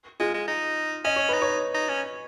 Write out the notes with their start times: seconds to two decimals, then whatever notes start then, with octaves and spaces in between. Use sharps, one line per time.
0.20 G#3 F4
0.34 G#3
0.48 D#4
1.04 C#4 D#5
1.16 C#5
1.29 D#4 B4
1.42 C#5
1.74 D#4
1.89 C#4